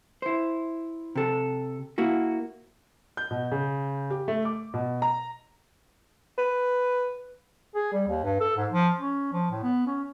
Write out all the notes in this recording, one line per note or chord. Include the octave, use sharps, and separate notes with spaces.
E4 C5
C3 A4
A#3 E4 F#4
G6
B2
C#3
G4
A3
D6
B2
A#5
B4
G#4
G3
D#2
G2
A4
G#2
F3
C#4
F3
A2
B3
C#4